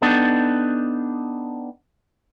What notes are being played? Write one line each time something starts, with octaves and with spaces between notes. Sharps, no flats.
B3 D4 D#4 G4 A4